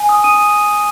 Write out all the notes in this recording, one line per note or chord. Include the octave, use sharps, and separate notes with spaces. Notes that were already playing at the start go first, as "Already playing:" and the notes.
Already playing: G#5
D#6
D#6 D#7